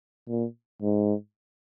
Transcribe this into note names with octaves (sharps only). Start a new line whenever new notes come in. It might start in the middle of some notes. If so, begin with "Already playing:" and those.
A#2
G#2